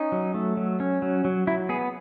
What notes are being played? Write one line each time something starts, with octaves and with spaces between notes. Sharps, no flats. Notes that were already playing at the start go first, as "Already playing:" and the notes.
Already playing: C#4 D#4
F#3
A3
F#3
C#4
F#3
F#3
F#3 E4
B3 G#4